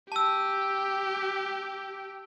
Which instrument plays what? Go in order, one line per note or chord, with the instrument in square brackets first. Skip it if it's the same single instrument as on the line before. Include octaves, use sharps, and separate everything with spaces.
[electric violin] G4 [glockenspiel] A5 E6